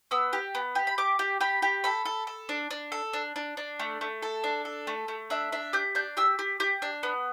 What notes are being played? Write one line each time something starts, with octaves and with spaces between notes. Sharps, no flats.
B3 E6
G4
B3
G4
B5
G4 D6
G4
G4 B5
G4
A4 B5
A4
A4
D4
D4
A4
D4
D4
D4
A3
A3
A4
D4
A4
A3
A3
D4 E5
D4 E5
G4 G6
D4 G6
G4 E6
G4
G4 G6
D4
B3